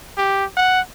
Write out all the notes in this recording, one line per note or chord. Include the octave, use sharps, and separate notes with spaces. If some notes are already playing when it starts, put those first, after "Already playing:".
G4
F#5